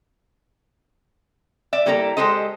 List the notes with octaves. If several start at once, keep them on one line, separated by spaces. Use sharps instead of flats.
D5 E5
G3 A#3 E4 A4 D5 A#5
G#3 G4 A4 C5 D#5